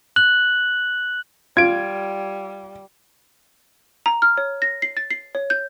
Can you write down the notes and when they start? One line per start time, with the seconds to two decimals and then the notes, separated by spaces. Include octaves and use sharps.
0.16 F#6 F#7
1.57 G3 F4 G#6 D7
4.06 A#5
4.22 F6
4.38 C#5
4.62 A#6
4.82 C7
4.97 A6
5.11 C7
5.35 C#5
5.50 G6